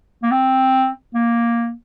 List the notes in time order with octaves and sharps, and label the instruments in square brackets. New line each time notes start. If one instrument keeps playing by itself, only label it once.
[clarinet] A#3
C4
A#3